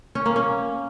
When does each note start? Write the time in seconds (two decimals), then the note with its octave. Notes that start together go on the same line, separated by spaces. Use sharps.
0.15 C#4
0.26 A#3
0.36 C#4